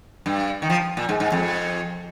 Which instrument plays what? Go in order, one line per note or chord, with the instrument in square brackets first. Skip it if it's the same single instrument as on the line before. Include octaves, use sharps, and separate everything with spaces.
[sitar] G2
D#3
F3
A#2
G#2
G#2
F2